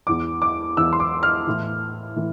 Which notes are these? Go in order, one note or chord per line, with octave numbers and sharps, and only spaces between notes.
E2 E3 D6
D6
E2 E3 E6
C6
D6
F6
A2 E3
A2 E3